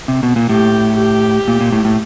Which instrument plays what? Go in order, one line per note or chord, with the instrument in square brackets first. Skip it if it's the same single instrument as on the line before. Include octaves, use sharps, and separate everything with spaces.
[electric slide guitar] C3
B2
A#2
[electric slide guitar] A2 [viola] G4
[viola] G4
[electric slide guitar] A#2
A#2
A2
A2